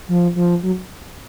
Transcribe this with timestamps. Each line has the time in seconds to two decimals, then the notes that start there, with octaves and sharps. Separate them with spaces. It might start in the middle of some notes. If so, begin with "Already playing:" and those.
0.08 F3
0.36 F3
0.63 F#3